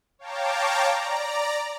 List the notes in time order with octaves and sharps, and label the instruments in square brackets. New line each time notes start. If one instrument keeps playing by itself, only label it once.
[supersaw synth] C#5 F5 G5 A5 A#5 D6
D5 A#5